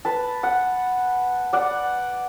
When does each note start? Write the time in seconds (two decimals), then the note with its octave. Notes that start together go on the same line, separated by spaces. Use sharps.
0.05 B4 A5
0.43 F#5
1.53 D5 F#5